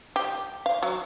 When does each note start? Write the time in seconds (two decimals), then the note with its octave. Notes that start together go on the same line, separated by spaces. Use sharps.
0.16 G4
0.66 F5
0.83 F#3